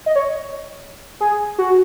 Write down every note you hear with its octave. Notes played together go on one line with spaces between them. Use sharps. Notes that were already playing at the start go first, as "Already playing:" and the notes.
D#5
C#5
G#4
F#4